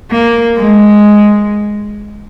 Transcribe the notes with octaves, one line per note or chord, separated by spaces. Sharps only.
A#3
G#3